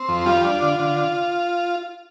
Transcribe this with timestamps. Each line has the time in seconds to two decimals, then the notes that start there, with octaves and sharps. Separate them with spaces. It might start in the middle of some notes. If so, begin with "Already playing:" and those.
Already playing: C4
0.08 F2
0.26 G3 F4
0.44 D4
0.62 D3
0.80 D3